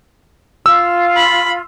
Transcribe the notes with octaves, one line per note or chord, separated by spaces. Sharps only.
F4 E6
B5